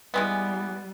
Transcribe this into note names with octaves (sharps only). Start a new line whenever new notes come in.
E3 G3 G#3 B3